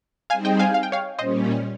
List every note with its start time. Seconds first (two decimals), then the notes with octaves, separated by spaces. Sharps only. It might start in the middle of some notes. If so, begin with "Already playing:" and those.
0.30 G3 C4 D#4 G#4 C5 F5 G#5
0.45 D#5 G5
0.59 F5 G#5
0.74 F5
0.83 G5
0.92 C#5 F5
1.19 A#2 G3 C#4 C5 D#5